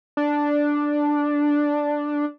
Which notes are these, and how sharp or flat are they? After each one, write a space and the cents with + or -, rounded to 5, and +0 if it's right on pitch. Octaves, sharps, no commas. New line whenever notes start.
D4 +0